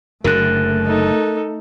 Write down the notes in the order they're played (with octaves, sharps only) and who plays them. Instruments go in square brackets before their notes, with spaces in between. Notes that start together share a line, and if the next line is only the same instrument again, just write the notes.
[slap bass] F#1 F#2 D3 [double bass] A3 [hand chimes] A#4 F#6
[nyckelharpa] D#4 A4